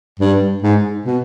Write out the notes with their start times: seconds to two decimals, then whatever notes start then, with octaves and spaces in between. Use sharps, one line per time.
0.20 G2
0.62 G#2
1.05 B2